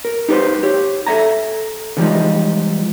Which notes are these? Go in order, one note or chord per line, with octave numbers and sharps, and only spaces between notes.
A#4
D#4 G4 A4 B4 C5
G4 C#5
A4 C5 E5 G#5 A#5
D3 E3 F3 G3 G#3 D#4